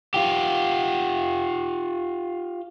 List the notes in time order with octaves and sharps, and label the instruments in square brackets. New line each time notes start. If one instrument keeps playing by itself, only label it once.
[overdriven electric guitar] F4 G4